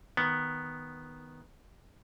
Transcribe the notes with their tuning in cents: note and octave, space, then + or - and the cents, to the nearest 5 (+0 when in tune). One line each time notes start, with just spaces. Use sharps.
D#3 +0 B3 +0